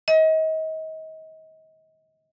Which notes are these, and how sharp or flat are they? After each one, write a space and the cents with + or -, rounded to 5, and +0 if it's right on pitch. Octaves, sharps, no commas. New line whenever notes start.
D#5 +35